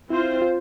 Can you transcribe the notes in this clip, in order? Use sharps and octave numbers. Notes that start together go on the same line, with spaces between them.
C4 E4 F4 C5
F4